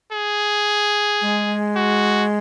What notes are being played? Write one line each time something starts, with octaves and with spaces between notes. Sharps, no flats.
G#4
G#3
F#4